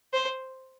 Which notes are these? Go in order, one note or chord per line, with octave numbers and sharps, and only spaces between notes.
C5